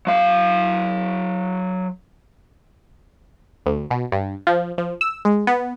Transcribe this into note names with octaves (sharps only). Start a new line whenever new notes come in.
F#3 F5
D2
B2
G2
F3
F3
E6
G#3
B3